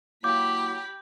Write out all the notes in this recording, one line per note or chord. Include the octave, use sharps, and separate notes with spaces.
F#3 A#3 E4 G4 B5 D6 G6